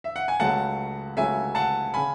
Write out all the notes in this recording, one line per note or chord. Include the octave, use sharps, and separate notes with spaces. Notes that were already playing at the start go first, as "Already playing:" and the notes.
E5
F#5
G#5
C#2 C#3 F#3 A3 F#5 A5
C#2 C#3 F#3 A3 E5 G#5
F#5 A5
C#3 G#5 B5